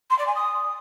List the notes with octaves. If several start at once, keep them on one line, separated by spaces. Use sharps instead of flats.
C6
D5
G#5
D#6